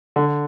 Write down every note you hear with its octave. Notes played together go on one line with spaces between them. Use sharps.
D3